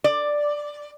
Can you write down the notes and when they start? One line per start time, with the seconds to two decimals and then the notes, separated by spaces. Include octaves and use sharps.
0.04 D5